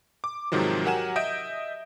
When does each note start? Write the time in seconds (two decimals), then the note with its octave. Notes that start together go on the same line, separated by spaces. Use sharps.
0.24 D6
0.52 G#2 C3 D#3 F3 F#3
0.85 F#3 G4 A#4 F#5 G#5 E7
1.16 D#5 E5 D#6 G6 D7